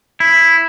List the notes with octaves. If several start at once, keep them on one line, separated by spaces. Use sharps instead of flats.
E4